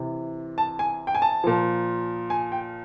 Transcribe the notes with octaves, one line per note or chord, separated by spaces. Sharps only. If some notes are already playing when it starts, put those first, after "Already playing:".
Already playing: C3 E3
A5
G#5
G5
G#5
A5
A#2 F3
G#5
G5